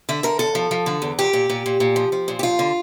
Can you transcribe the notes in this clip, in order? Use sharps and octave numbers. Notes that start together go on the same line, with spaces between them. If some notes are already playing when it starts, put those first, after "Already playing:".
D3 E5
D3 A#4
E2 A4
F3
F3
D3
E2
A#2 G4
A#2
A#2
A#2
A#2
F3
F3
A#2
G4
F3 F4
D3